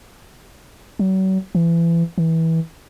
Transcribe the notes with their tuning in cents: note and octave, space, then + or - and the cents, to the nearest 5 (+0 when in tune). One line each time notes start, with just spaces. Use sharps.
F#3 +40
E3 +30
E3 -20